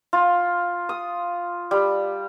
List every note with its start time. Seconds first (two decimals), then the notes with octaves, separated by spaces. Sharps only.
0.13 F4
0.89 D#6
1.71 G3